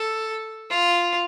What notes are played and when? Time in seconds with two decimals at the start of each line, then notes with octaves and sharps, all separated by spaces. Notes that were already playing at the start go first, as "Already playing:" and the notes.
Already playing: A4
0.70 F4